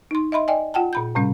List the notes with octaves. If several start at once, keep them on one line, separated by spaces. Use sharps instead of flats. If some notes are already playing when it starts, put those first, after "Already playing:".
D#4 C6
D#5 E5 B5 C6
D5 D#5 G5 G#5
F4 F#5 G5 A5
A#2 B5 G6
A2 C3 G3 C#4